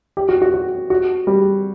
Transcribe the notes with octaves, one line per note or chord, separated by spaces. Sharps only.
G4
F#4
F#4
F#4
F#4
G3